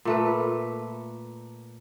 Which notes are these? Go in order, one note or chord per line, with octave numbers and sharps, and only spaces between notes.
A#2 A3 B4